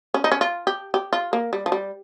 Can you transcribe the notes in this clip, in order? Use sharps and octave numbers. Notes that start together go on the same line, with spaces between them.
C#4
D#4
C#4
F4
G4
G4
F4
A#3
G3
F3
G3